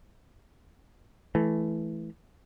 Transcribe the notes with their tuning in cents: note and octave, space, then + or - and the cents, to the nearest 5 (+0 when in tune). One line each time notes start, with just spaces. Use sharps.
E3 +0 A3 -20